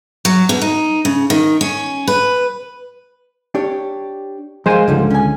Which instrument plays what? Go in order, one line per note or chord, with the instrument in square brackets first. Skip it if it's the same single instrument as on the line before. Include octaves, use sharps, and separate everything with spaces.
[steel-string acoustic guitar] F#3
B2
D#4
C#3
D#3
C#4
B4
[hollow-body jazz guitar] D4 G4 C#5
[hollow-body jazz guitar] F3 A#4 F5 [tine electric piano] G#3 C5 G#5
[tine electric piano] C#2 D3 [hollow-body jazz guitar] G#2 F3 G3
[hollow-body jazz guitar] C#4 G#5